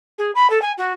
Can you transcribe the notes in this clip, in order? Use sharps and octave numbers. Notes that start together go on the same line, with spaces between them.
G#4
B5
A4
G#5
F#4